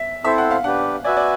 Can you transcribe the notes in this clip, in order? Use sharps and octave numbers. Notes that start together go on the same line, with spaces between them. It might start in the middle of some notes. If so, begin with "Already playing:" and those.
Already playing: E5
C4 E4 A4 C5 E5
F#5
F5
D4 G4 B4 F#5
F#4 B4 D5 E5 G#5
D5